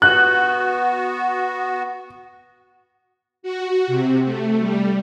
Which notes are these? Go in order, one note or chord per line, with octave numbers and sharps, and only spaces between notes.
B3 F#4 F#6
F#4
C3
A3
G3